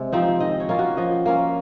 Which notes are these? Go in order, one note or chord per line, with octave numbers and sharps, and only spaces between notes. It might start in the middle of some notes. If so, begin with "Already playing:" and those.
Already playing: C3 G#3
F3 C4 D#4
D#3 D#5
C#5
A#3 C#4 F4
F#4
F3 D#5
A#3 C#4 F4